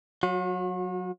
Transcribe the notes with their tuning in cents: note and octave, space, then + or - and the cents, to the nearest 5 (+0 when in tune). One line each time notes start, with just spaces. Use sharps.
F#3 -10 F#4 -45